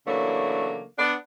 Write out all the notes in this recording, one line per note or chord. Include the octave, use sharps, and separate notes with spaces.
C#3 E3 F#3 A3 A#3 D4
B3 D4 F#5